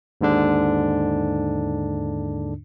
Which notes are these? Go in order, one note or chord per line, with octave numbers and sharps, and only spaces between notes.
D#2 G#2 D3 D4